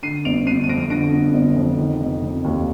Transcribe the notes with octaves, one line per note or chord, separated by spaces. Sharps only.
D3 C7 D#7
G1 D7 F7
G1 C7 D#7
D#7
F2 A#6 D7
D#7
D3 A#6 D7
G1
G1
F2
D#3
F1
F1
D#2